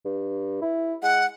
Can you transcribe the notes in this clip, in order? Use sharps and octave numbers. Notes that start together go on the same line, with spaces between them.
G2
E4
G#3 F#5